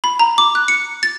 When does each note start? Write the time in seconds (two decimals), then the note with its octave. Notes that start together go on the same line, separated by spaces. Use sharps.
0.04 B5
0.19 A#5
0.38 D6
0.55 F#6
0.68 C#7
1.03 A6